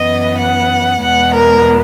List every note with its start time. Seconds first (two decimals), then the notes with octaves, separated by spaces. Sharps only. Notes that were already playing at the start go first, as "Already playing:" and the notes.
Already playing: F#2 E3 B3 D#5
0.40 F#5
1.03 E2 B2 G#3 B3 F#5
1.35 A#4